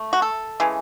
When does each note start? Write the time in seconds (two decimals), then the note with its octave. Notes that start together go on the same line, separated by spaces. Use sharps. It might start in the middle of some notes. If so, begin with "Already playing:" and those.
Already playing: A3
0.13 F#4
0.22 A4
0.60 C#3 E3 G#3